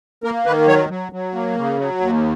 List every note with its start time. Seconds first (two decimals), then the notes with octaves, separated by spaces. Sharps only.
0.24 A#3 A#4
0.46 D#3 B4
0.67 F#3 C#5
0.89 F#3
1.12 F#3
1.34 A#3
1.56 C#3
1.78 F#3
2.00 D#2